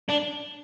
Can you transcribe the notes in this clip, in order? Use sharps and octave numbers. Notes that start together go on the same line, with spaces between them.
D4